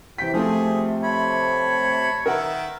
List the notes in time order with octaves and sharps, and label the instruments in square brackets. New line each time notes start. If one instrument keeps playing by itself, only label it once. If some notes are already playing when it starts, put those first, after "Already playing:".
[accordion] C3 [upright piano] E3 B6 [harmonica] G5
[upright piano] F3 A3 C4 [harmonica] G#4
[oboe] C#5 [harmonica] A5 B5
[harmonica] D#3 E5 [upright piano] A#4 B4 F#5